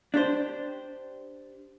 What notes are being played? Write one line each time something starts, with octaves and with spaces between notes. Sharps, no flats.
D4 G4 C5